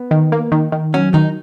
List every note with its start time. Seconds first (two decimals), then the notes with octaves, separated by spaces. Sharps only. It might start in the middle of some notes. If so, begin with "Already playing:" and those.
Already playing: B3
0.11 D#3
0.32 A#3
0.52 D#3
0.72 D#3
0.94 F#3 C#4
1.14 D#3 D#4